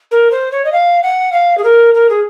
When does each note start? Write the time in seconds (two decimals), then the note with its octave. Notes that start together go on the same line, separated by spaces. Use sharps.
0.11 A#4
0.31 C5
0.51 C#5
0.65 D#5
0.72 F5
1.03 F#5
1.32 F5
1.57 G#4
1.64 A#4
1.94 A#4
2.09 G#4